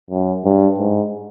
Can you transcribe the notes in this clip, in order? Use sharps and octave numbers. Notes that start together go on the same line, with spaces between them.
F#2
G2
G#2